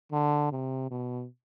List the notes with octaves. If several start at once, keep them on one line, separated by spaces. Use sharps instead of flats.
D3
C3
B2